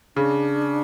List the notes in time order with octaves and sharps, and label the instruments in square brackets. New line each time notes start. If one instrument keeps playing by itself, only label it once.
[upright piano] C#3 [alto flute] D4